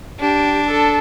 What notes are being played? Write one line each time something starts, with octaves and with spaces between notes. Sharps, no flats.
D4 G4
A4